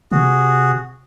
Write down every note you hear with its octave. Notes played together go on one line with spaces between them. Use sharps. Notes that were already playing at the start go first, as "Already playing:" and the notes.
C3 F#4 G#4